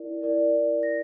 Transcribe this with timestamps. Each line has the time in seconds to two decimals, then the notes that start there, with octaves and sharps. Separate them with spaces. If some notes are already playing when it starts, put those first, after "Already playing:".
Already playing: E4 A#4 D5
0.21 E4 A#4 D5
0.83 A#6